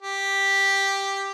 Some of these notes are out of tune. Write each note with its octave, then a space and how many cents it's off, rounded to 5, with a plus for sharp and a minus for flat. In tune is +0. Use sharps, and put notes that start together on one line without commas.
G4 +5